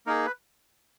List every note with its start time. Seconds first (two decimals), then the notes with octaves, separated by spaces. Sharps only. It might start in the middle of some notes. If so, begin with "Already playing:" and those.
0.06 A#3 D#4 G#4 A#4
0.26 B4